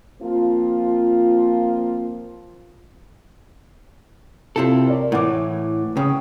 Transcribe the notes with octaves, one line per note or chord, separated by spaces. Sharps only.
F3 A#3 C4 F4
C3 C4 E4 F4 A4
A#4 C#5 D5
A2 E3 E4 F#5 D6
C#3 G5 D#6